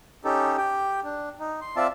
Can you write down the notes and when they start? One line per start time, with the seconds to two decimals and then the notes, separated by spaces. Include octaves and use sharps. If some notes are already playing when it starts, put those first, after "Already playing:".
0.25 C#4 D#4 G4 A4
0.58 G4 G5
1.04 D4
1.40 D#4
1.61 C6
1.76 C4 F4 D5 E5 A5